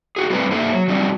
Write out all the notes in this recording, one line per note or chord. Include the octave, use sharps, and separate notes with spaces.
D#4 F#4 G#4
G3 A3 C4 E4 B4 C5
A#3 D#4 A4 C5 E5
F#3
F3 G3 C4 D4 D#4 F#4